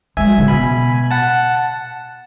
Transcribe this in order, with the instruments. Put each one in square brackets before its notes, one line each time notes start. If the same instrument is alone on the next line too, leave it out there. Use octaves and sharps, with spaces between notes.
[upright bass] G#3 [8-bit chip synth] E5 G#5
[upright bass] F#3
C#3
[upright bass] B2 [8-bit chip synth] G#5 B5
[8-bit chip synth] F#5 A5